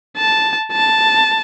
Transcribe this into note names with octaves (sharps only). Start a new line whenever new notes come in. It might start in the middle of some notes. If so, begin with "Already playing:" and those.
A5
A5